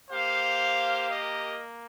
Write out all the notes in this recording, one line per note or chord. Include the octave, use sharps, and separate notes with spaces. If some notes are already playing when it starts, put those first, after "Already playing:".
A#3 G4 C5 F5
A#4 D#5